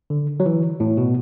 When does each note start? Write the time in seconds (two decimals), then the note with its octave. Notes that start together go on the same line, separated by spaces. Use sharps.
0.10 D3
0.40 F#3
0.46 E3
0.80 A2
0.98 B2